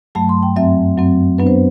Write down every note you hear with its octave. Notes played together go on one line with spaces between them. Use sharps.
G2 F#3 A3 A5
C6
G5
F#2 F#3 C4 E5
F#2 F#3 C4
F#2 F#3 B3 D4 B4
C5